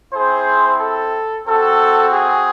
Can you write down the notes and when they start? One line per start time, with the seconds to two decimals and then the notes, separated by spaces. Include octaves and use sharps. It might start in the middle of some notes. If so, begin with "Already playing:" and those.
0.13 C4 E4 G#4 C5
0.80 A4
1.47 C4 F#4 A4
2.13 G#4